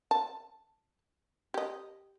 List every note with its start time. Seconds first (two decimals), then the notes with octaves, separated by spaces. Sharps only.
0.11 A5
1.54 G4 D#5